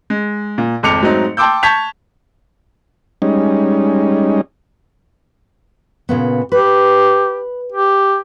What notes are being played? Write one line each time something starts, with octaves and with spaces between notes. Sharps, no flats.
G#3
A#2
G#1 F2 D6 C#7 F7
G#2 F#3 A3 C4 D#4
G5 A5 C6 D6 E6 G6
A5 C#6 G6 G#6 B6 F7
G3 G#3 C#4 D#4
A#2 C#3 B3
G4 B4
G4